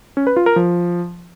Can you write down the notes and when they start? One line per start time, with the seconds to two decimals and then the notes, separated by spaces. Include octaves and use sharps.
0.17 C#4
0.27 B4
0.36 F4
0.46 A#4
0.56 F3